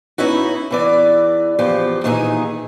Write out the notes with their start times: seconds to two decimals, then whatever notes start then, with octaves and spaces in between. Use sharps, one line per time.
0.18 B3 C#4 D#4 E4 F#4
0.71 E2 E3 D5
1.59 E2 F3 G4
2.04 A#2 D#3 E3 D#4 G#4